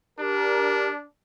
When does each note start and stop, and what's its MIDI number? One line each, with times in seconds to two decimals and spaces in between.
0.19 1.07 62
0.19 0.89 67
0.19 0.89 70